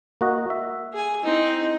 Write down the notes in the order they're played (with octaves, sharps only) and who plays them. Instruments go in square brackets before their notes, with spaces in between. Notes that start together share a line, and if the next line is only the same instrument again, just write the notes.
[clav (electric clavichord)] A#3 F#4 D#5
E5
[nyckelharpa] G#4 G#5
[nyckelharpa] C4 D#4 [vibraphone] E4 D#5